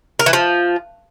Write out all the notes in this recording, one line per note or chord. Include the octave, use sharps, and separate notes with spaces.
A#4
E3
F3